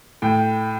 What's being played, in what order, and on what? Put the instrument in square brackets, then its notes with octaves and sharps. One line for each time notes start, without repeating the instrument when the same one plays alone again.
[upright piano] A2 G5